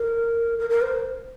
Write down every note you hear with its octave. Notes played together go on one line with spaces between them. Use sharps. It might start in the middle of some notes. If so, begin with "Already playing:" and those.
Already playing: A#4
A#4
A#4
C5